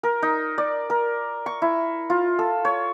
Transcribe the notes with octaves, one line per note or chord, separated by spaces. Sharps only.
A#4
D#4
D5
A#4
C#6
E4
F4
A4
C#5